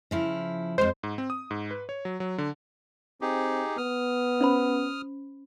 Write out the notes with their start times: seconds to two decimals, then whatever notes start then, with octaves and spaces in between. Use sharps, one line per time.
0.11 C#3 F3 E4
0.78 F2 G#3 C5
1.03 G#2
1.18 C4
1.30 D#6
1.51 G#2
1.71 B4
1.89 C#5
2.05 F#3
2.20 F#3
2.38 D3
3.21 C4 D#4 G4 G#4
3.78 B3 D#6 F6
4.41 C#4 C5 B5